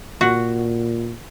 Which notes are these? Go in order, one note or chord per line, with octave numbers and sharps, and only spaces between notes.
A#2 F#4